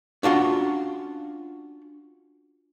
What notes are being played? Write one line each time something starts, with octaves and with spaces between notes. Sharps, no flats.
C#4 D4 F4 F#4